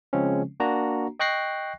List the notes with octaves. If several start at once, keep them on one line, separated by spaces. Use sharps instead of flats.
C#3 F3 G#3 C4 C#4
A#3 D4 F#4 A#5
D#5 G5 C#6 F#6 A#6 C7